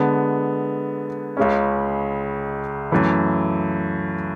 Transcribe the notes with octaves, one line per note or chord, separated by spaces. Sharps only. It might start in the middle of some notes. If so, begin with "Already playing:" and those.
Already playing: D3 G#3 B3
C#2 C#3 G#3 C#4
F#2 E3 A3